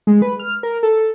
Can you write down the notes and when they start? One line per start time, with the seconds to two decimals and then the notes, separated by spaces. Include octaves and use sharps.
0.07 G#3
0.22 B4
0.40 F6
0.63 A#4
0.83 A4